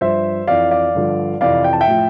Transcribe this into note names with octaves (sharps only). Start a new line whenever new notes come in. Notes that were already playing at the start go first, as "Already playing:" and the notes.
G2 F3 C5 E5
F2 E3 D5 F5
D5 F5
G2 D3 F3
F2 C3 E3 D5 F5
G5
A5
E5 G5
A2 F3